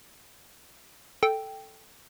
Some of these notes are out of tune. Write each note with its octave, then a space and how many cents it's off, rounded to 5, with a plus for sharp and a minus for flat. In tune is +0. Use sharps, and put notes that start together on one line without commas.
A4 +0 G5 +0